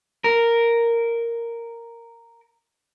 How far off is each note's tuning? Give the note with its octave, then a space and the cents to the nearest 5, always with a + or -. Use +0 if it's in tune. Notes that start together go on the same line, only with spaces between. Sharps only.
A#4 -5